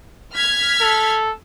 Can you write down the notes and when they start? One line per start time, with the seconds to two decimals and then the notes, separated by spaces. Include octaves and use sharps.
0.34 F6 G#6 B6
0.81 A4